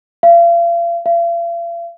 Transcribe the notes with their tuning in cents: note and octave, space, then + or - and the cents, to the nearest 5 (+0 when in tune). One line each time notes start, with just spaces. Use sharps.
F5 -40
F5 -45